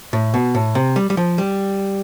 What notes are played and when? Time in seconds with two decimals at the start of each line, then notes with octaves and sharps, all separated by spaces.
0.13 A2
0.34 B2
0.55 A2
0.75 C3
0.96 G3
1.10 G3
1.17 F3
1.38 G3